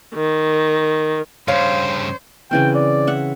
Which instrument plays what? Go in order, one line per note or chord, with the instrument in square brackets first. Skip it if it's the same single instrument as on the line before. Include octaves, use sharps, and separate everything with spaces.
[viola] D#3
[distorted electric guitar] G2 C#3 [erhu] C5 [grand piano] C#5 [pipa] F5
[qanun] C#3 E3 C4 [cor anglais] G5
[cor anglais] D5
[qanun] E5 F#5